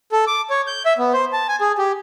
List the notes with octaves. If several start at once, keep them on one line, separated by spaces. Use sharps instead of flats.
A4
D6
C#5
G6
E5
B3
C5
A5
G#5
G#4
G4